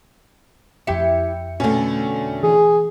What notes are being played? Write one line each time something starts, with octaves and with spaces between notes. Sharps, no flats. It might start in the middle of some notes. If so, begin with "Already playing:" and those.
F2 E4 G4 G5 C#7
B2 D3 A3 C#4
E3 G#4